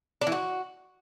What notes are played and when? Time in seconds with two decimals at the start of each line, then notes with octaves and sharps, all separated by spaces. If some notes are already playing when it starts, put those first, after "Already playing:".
0.21 D4
0.27 E3
0.32 F#4